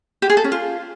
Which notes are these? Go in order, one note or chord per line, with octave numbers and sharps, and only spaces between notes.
G4
G#4
A4
C#4
F4